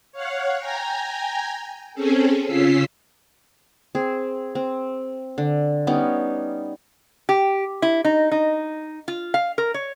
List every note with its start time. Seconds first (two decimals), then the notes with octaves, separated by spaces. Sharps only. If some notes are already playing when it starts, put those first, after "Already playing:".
0.12 C#5 F5 F#5
0.58 G5 G#5 A#5
1.94 C4 C#4 G#4 A4
2.46 C#3 C#4 F4 E6 B6 C7
3.95 C4 G#4
4.55 C4
5.38 D3
5.87 G3 B3 C#4 D#4
7.29 G4
7.82 E4
8.05 D#4
8.32 D#4
9.08 F4
9.34 F5
9.58 A#4
9.74 C#5